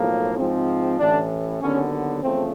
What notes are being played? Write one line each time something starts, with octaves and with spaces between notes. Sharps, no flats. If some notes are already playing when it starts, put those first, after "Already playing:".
Already playing: B1 A2 F3 A#3
G#2 F3 G#3 C4
A1 A2 D3 E3 D4
D#2 D3 F#3 B3 C#4
E2 C#3 F3 A3 C4